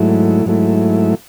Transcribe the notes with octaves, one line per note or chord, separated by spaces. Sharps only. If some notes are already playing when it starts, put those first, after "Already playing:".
Already playing: G#2 F#3 A3 E4
G#2 F#3 A3 E4